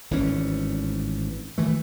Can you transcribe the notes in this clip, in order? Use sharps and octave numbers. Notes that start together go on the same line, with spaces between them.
G#1 A2 E3 C#4
D#3 E3 A3